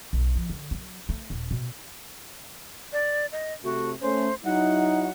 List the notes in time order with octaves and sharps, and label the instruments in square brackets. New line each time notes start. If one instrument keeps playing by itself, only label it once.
[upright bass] B1
F3
D3
F#3
A3
D#1
B2
[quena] D5
D#5
[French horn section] C3 A3 [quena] F#4
[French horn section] A3 C#4 [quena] C5
[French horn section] F#3 D#4 E4 [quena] F#5